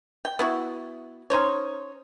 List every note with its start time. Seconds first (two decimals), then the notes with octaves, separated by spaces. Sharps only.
0.25 G5
0.39 B3 E4 F#4
1.30 C#4 D#4 C5 C#5